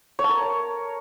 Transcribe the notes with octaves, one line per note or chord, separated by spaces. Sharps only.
C#5
A5
A#4